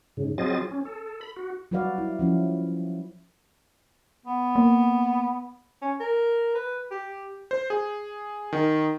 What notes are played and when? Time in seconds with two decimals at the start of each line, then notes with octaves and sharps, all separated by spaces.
0.17 G#2 C#3
0.38 F#3 C4 F4 G#4 D#5 A6
0.71 C#4
0.85 A4
1.21 B5
1.36 F#4
1.71 F#3 G3 F#4 B4 D5 F5
1.98 E4
2.19 F3 C#4 E4
4.26 B3
4.56 A#3
5.82 C#4
6.00 A#4
6.55 B4
6.91 G4
7.51 C5
7.70 G#4
8.53 D#3